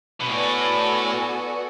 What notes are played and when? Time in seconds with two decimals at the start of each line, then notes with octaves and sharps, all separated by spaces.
0.21 B2
0.30 A2 B3 F#4 A4 D5 G#5